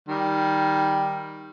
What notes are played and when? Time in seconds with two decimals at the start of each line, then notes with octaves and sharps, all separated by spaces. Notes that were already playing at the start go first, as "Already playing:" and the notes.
0.09 D#3 G3